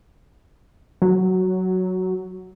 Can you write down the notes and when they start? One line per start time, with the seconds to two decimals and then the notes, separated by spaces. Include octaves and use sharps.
1.02 F#3